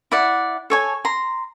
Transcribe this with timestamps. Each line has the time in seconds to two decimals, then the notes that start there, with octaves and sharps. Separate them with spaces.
0.11 E4 D5 F#5
0.70 A4 C#5 G#5
1.05 A#5 C6